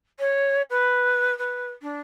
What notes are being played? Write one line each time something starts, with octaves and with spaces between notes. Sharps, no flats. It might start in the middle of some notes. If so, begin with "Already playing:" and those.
C#5
B4
B4
D4